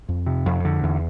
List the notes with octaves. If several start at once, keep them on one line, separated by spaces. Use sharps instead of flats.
F2
C3
F2
D3
E2